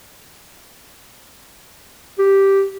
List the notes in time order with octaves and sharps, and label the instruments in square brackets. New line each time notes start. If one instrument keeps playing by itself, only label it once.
[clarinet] G4